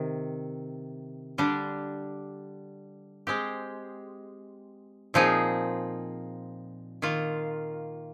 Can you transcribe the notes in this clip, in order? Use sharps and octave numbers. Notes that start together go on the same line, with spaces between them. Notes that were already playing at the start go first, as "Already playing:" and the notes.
Already playing: C3 D#3
D3 G3 D4 G4
G#3 C4 G4
A#2 F3 C4 D#4 G#4
D#3 A#3 F4